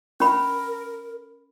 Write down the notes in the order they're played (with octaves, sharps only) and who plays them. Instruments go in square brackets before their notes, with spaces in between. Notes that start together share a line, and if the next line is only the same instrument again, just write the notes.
[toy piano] C#4 B5 [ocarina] A#4